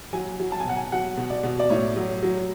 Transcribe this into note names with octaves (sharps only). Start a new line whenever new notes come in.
F#3 G#5
F#3
A5
G#5
B2 F#5
G#5
F#3 F#5
B2
D5
B2
D5
A2 C#5
F#3
F#3